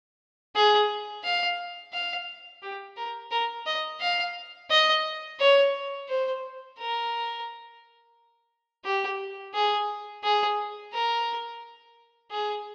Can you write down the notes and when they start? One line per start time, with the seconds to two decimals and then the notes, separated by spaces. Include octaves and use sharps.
0.55 G#4
1.24 F5
1.93 F5
2.62 G4
2.97 A#4
3.31 A#4
3.66 D#5
4.00 F5
4.70 D#5
5.40 C#5
6.09 C5
6.78 A#4
8.85 G4
9.54 G#4
10.23 G#4
10.93 A#4
12.31 G#4